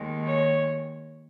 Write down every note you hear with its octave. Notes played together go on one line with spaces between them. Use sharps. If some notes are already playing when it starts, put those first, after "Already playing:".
Already playing: D#2 D#3 G#3
C#5